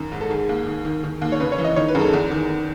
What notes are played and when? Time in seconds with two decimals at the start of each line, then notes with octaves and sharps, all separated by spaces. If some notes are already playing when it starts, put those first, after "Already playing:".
Already playing: F#2 D#3
0.12 G#2
0.21 A4
0.30 D#3 G#4
0.49 D#2
0.67 D#3
0.85 D#3
1.04 D#3
1.22 D#2
1.32 C#5
1.40 C#3 B4
1.52 C#5
1.58 E3
1.64 D#5
1.76 D#3 C#5
1.88 B4
1.95 F#2 G#4
2.01 A4
2.13 E2
2.31 D#3